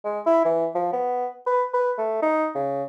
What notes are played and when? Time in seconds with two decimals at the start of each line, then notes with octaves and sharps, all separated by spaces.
0.05 G#3
0.26 E4
0.45 E3
0.75 F3
0.93 B3
1.47 B4
1.74 B4
1.98 A3
2.22 D#4
2.55 C#3